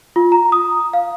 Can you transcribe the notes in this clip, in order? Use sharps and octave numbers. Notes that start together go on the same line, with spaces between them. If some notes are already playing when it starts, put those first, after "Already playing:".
F4
A#5
D#6
F5